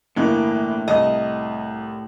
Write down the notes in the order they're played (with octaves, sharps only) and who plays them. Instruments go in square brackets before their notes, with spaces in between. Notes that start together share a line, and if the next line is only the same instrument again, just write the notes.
[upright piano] G1 E3 A#3 [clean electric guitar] A2
[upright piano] C2 [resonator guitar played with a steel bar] D#5